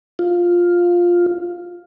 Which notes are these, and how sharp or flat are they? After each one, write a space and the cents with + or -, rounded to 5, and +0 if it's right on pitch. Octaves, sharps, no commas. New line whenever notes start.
F4 +5